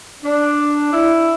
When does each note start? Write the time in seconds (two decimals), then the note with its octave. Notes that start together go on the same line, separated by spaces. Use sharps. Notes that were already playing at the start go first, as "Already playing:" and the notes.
0.23 D4
0.93 E4